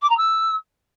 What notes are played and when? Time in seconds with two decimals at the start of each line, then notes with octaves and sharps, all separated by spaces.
0.02 D6
0.09 A#5
0.17 E6